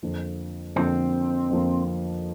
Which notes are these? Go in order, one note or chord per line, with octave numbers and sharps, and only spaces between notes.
F2 D3 F3 A#3
F2 D3 F3 A#3 C4
F2 D3 F3 A#3